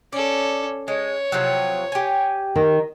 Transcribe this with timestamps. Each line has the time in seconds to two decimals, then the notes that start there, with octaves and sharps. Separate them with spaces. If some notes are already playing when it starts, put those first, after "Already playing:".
0.13 C#4 A4 D5
0.88 G#3 C#5
1.32 C3 F3 F#3
1.92 G4 G#5
2.56 D#3